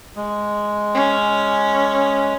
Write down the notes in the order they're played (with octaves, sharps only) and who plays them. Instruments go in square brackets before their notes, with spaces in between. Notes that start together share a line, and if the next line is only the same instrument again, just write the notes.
[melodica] G#3
[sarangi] C#4